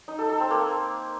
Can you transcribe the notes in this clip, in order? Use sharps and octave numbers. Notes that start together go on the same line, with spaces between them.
D#4
A4
A4
C4
A#3